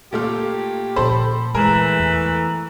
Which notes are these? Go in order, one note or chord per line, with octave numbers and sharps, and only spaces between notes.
A#2 A3 F4 G4
A#2 F3 A4 C5 B5
E3 G#3 A3 G#4 A#4
E2